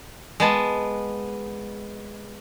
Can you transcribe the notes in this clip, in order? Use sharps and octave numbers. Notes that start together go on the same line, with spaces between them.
G#3 B3 A5